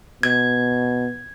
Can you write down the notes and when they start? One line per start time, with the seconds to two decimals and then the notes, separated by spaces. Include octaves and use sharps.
0.23 B2 G#6